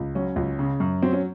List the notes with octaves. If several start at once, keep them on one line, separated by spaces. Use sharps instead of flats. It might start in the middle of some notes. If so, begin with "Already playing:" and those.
Already playing: C#2
F#3 C#4
C#2
C#3
F#2
F#3 C4
C#4